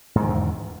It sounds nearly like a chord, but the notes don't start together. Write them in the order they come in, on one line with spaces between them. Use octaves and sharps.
G#2 D#3 D3 E2